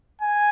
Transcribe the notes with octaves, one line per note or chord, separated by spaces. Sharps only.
G#5